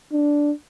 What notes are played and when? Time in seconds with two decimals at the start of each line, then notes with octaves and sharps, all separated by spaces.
0.12 D4